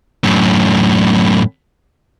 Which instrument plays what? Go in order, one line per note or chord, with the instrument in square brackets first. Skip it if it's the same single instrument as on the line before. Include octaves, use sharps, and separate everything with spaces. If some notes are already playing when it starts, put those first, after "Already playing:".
[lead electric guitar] F#2 A2